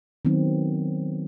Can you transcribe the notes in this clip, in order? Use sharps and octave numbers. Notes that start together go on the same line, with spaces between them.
D#3 F#3 B3 C4